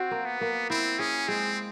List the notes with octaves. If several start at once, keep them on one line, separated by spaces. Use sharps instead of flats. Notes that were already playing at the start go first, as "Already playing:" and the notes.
Already playing: C4 F#4
A#3
B3
A#3
C4 E4
C#4 G#4
G#3 C4